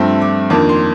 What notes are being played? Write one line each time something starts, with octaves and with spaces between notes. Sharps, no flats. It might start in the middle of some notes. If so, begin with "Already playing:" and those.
Already playing: G2 F3 A3 C4
D6
F2 D#3 A#3 D4 D6
C6